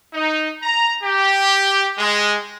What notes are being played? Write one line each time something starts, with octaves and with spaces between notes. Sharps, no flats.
D#4
A#5
G4
G#3